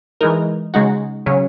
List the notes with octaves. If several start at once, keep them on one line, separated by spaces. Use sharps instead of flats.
E3 G#3 D#4 A#4
C#3 G#3 D#4 F#4
C#3 F#3 C#4